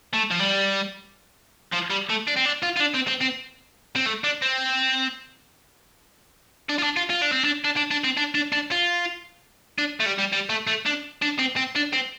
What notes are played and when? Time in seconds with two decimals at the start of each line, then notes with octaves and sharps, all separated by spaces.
0.13 A3
0.31 F3
0.39 G3
1.73 F3
1.91 G3
2.10 A3
2.28 D4
2.37 C4
2.46 D4
2.63 F4
2.77 F4
2.80 D4
2.95 C4
3.08 C4
3.22 C4
3.96 C4
4.06 A3
4.24 D4
4.42 C4
6.69 D4
6.79 F4
6.83 D4
6.97 F4
7.10 F4
7.22 D4
7.32 C4
7.44 D4
7.64 D4
7.76 D4
7.91 D4
8.04 C4
8.17 D4
8.35 D4
8.52 D4
8.72 F4
9.78 D4
10.00 A3
10.06 G3
10.18 G3
10.32 G3
10.49 A3
10.67 A3
10.86 D4
11.22 D4
11.39 C4
11.56 C4
11.76 D4
11.93 C4